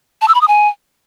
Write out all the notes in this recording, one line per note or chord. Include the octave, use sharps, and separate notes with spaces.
A5
E6
B5
D#6
G#5